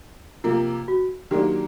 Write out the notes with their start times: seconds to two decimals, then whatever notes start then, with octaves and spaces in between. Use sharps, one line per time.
0.44 C3 F3 A#3 F4
0.88 F#4
1.31 D#3 F#3 A#3 D4 G4